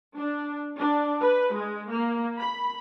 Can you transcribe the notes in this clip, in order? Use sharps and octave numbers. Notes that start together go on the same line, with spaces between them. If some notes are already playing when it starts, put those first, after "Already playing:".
D4
D4
B4
G#3
A#3
B5